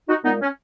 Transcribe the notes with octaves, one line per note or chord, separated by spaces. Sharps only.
D#4 F#4
A#2 G#3 B3 D#4
C#4